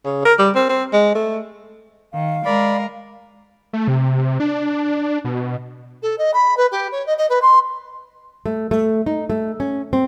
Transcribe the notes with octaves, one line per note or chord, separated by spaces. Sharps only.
C#3
A#4
G3
C4
C4
G#3
A3
D#3 F5
G#3 A#4 D5 B5
A3
C3
D4
B2
A4
D#5
B5
B4
G4
C#5
D#5
D#5
B4
C6
A3
A3
D#4
A3
C#4
C4